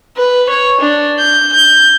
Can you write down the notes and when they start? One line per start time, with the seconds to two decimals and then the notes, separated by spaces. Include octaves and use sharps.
0.17 B4
0.50 C#5
0.81 D4
1.19 G6
1.53 G6